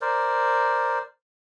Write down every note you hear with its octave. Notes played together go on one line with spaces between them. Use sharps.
A#4 C5 D5